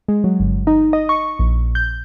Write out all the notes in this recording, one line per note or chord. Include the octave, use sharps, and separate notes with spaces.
G#3
F#3
G1
D#4
D#5
C#6
A#1
G6